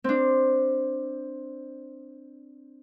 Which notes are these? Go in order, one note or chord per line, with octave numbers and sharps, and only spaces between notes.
C4 D4